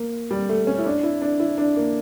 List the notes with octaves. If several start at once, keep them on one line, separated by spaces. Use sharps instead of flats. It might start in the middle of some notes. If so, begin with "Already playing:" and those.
Already playing: A#3
G3
A3
C#4
E4
D4
E4
D4
E4
D4
A#3